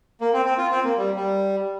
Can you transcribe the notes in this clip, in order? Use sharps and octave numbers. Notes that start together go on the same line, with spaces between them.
A#3
C4
C4
F4
C4
A#3
G3
G3